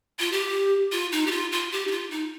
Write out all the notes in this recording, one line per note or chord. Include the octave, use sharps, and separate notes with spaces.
F4
G4
F4
D#4
G4
F4
F4
G4
D#4
F4
D#4